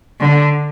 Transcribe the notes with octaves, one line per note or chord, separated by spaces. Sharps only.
D3